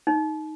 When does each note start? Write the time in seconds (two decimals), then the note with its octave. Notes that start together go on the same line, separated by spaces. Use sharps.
0.07 D#4